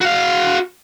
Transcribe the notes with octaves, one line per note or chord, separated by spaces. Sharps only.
F#4 F5